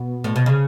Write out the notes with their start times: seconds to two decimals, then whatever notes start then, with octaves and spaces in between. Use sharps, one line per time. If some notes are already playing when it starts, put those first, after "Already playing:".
Already playing: B2
0.24 A2
0.36 B2
0.46 C#3